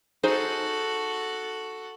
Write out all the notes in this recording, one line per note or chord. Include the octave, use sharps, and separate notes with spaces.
D#4 F#4 G#4 A4 C5